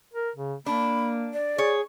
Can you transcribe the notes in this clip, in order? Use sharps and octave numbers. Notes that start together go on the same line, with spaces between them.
A#4
C#3
A#3 D4 B5
D5
G#4 C#5